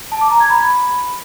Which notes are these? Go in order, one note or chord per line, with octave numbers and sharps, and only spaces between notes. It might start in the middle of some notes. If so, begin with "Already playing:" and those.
A5
D6
A#5
G#6
B5